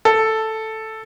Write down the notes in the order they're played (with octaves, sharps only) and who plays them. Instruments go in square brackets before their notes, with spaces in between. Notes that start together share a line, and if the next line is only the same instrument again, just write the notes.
[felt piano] A4